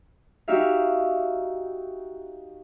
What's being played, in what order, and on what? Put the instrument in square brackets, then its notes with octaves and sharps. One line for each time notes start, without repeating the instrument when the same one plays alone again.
[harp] D#4 F#4 G4 E5 F5